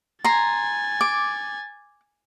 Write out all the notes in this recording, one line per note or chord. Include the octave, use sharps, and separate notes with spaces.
G#5 A#5 C6 A6
D6